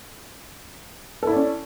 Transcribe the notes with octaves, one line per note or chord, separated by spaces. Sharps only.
C#4 E4 A4 D5